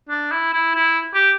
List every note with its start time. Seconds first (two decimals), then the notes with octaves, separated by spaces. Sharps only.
0.09 D4
0.31 E4
0.53 E4
0.76 E4
1.14 G4